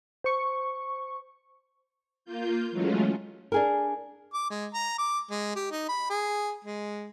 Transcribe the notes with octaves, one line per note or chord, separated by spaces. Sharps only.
C5 C#6
A#3 F4 G6
E3 F#3 G#3 A3 C#4 F4
D4 G#4 A#4
D6
G#3
A#5
D6
G#3
G4
D#4
B5
G#4
G#3